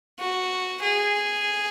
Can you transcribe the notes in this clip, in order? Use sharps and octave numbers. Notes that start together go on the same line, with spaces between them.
F#4
G#4